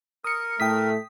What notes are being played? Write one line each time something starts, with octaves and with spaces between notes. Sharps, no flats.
A#4 D#6 C#7
A2 A3 G5 D#6 B6